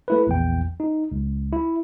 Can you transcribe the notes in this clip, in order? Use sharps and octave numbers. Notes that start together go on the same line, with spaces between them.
A3 E4 B4
A#1 E2 G5
D#4
C#2
E4